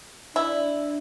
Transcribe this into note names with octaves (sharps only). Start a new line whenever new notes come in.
D4 E4